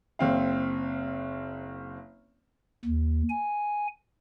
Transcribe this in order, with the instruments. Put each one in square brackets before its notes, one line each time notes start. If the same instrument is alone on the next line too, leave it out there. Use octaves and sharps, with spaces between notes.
[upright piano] F#1 C4 F5
[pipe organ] D#2
G#5